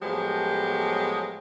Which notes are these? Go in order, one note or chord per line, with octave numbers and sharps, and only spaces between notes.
A2 F3 F#3 G#3 B3 G4